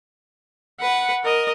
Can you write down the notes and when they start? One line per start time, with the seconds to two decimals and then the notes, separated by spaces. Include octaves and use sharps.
0.80 B4 F#5
1.24 A#4 D#5